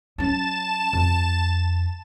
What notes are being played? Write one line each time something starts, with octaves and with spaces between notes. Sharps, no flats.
F#3 C#4 A5 E7
F2